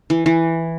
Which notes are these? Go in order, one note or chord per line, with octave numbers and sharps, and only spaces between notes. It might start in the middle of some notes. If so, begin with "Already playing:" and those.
E3
E3